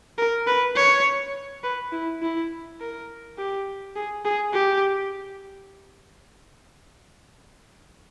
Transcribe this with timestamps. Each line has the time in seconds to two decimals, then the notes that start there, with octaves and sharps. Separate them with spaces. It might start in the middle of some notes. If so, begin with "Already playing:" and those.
0.18 A#4
0.47 B4
0.76 C#5
1.64 B4
1.92 E4
2.22 E4
2.80 A#4
3.38 G4
3.96 G#4
4.25 G#4
4.54 G4